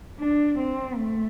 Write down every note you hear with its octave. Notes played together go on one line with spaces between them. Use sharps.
D4
C4
A3